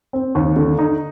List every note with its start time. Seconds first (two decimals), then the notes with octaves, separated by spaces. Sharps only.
0.13 C4
0.35 D#2
0.56 D3
0.79 D#4